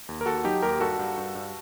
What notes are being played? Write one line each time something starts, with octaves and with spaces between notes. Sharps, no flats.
D#2
A#4
D#2 F#4 A4
F#3 D#4 G4
D#2 G4 A#4
G2 F#4 A4
G2
G2
G2